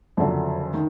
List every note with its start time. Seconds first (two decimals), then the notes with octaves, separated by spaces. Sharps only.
0.17 F#1 F2 D3 F#3
0.74 D#3